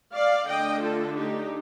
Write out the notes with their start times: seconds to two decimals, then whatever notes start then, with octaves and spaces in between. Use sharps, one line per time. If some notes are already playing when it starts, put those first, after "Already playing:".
0.14 D5 F5
0.47 D3 A3 D4 D#5 G5
0.82 F4 A4
1.17 D#4 G4